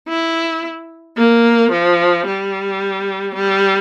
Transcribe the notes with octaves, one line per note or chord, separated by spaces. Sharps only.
E4
A#3
F3
G3
G3